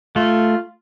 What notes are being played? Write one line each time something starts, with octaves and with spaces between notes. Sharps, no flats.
A3 F4